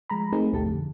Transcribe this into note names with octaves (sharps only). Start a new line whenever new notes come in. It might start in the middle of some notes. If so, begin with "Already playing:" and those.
F3 G#3 A#5 B5
A3 C4 D#4 G#4 A#4
A1 D2 B2 A3 G4 A5
F2 D3